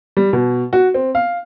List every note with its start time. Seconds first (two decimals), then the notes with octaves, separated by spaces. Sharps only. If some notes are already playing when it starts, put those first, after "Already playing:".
0.17 G3
0.33 B2
0.73 F#4
0.94 C4
1.15 F5